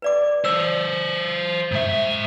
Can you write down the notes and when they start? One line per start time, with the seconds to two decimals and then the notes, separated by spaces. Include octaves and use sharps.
0.02 B4 D5 D6
0.45 C5 A5 E6
1.72 G#2 E5